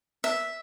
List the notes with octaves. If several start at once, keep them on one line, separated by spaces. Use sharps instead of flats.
E5